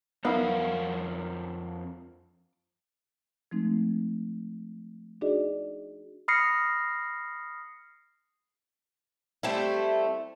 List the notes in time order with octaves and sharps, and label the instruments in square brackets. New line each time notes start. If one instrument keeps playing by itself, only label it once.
[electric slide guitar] F2 A#4 F#5 [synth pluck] B3 D#4 E4 [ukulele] F5
[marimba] F3 G#3 A3 C4 D#4
D4 D#4 F#4 G#4 D5 D#5
[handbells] B5 D#6 F6 A#6 C7 C#7
[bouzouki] G3 A3 C4 E4